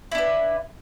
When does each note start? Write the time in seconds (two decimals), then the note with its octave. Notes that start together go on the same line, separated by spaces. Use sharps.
0.12 E4
0.15 D4
0.18 B4